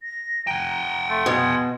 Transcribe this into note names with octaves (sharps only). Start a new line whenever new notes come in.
A#6
F#5 G5 A#5
A3 C6
B2 G#4